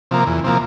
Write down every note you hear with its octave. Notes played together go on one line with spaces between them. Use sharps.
C3 F3 A#3
E2
C3 F3 A#3